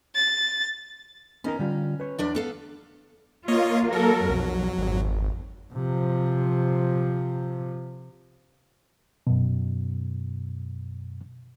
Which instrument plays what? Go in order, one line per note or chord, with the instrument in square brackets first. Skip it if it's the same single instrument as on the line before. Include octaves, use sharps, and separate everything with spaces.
[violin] A6
[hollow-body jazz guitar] B3 D#4 A#4 [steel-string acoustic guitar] C#4
[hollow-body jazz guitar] D3 G3 F4
B4 C#5
[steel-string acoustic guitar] E2 D4 D5
B3 A4 F5
[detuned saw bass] A#3 [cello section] F4 [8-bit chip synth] C#5 D#5
[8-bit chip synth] F#3 [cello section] A4 A#4
[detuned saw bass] B1 [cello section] F2
[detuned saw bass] G#1
[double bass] C3 F3
[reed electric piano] F#2 B2